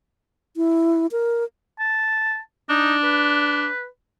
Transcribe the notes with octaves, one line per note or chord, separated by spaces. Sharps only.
E4
A#4
A5
D4 D#4
B4